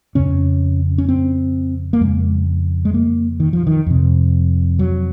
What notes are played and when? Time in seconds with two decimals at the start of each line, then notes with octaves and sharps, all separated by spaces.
0.15 F2 C#3 C#4
0.98 C#4
1.09 C4
1.93 A#3
2.01 F2 C#3 G#3
2.85 G#3
2.94 A#3
3.40 D#3
3.53 F3
3.67 D#3
3.86 F2 C3
4.79 F#3